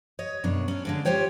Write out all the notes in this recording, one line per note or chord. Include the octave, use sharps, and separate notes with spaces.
C#5 D#5
F#2 B2 D4 C#5
C#4 D4
D3 G#3 D4
F4 G4 C5 C#5 G5